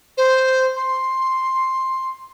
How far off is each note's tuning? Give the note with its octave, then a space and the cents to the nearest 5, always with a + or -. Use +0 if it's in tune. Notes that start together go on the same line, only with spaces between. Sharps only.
C5 -5
C6 +5